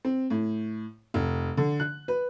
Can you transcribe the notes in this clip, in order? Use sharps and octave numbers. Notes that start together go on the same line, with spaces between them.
C4
A2
F1
D3
F#6
B4